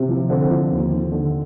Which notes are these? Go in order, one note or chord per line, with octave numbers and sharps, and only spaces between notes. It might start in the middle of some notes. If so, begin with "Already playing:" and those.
Already playing: C3
F3
D3 C4
F3
D#2
D#2
D3